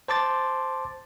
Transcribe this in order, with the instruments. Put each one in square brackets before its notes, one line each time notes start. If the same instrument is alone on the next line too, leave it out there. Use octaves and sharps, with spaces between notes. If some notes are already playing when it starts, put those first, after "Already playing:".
[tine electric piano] C5 A5 C6 D6 A6